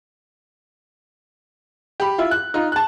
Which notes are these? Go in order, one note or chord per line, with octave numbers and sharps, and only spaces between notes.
G4 B5
E4 F4
F#6
D#4 F4
A5 F#6